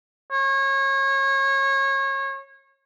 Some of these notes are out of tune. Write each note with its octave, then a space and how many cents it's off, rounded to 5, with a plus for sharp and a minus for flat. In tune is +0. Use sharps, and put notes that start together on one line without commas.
C#5 -30